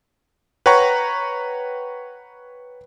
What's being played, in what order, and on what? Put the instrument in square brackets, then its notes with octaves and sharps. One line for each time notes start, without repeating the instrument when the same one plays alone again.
[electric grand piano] B4 C#5 F#5 G5 A#5 C#6